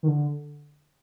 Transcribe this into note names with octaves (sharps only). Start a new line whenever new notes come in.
D#3
D3